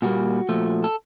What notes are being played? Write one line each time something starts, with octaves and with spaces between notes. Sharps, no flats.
A#2 G3 A#3 F#4
A#2 F3 A3
A4